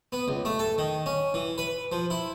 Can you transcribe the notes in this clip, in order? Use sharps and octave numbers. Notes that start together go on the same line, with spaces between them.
B3
C#2
A3
A4
D#3
C#4
E3
B4
F3
E4